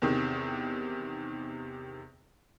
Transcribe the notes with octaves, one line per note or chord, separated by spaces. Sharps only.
E2 C3 D#3